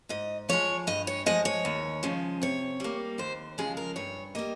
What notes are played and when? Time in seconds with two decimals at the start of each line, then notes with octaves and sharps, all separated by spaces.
0.09 G#2 D#5
0.49 F3 G#3 C#5
0.87 G2 D#5
1.07 C#5
1.26 F3 G#3 D#5
1.45 C#5
1.65 D#2
2.03 C#3 F3 G#3
2.42 C3 C#5
2.80 G3 A#3
3.18 D#2 C5
3.58 C#3 F3 G#3 G#4
3.77 A#4
3.96 G2 C#5
4.35 G3 A#3 D#5